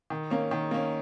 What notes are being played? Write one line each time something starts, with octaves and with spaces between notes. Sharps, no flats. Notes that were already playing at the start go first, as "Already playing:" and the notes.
D#3
A#3 C#4
D#3
A#3 C#4